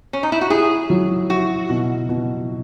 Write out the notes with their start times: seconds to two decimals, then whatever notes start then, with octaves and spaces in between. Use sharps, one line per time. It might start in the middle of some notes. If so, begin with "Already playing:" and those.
0.13 C#4
0.23 D#4
0.32 E4
0.41 F#4
0.50 E4 G#4
0.90 F#3
1.30 E4 F#4
1.70 B2
2.09 B2